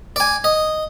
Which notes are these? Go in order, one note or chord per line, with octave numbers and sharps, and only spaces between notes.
D5 G#5
D#5